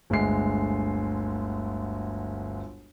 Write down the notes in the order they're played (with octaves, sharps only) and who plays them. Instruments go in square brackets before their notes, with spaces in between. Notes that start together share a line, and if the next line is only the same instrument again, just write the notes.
[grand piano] G1 D2 G#3 C7